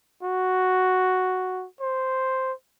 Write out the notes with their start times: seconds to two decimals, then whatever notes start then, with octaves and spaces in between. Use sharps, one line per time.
0.23 F#4
1.81 C5